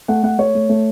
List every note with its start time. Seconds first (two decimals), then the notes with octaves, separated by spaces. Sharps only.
0.08 A3 F#5
0.23 A3 F#5
0.38 A3 C#5
0.55 A3
0.69 A3